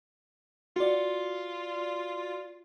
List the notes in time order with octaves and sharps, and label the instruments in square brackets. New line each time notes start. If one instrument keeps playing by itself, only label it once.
[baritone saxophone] F4 [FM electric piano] F#4 D5